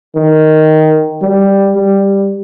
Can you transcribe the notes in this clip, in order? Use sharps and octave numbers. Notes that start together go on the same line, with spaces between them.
D#3
G3
G3